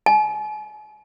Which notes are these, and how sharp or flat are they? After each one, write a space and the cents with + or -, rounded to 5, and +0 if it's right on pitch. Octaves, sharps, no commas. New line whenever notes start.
G#5 +40